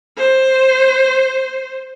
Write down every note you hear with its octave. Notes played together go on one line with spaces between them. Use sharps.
C5